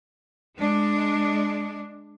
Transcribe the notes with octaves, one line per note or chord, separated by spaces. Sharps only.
G#3 D4